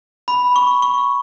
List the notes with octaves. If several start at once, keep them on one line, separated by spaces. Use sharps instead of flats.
B5
C#6
C#6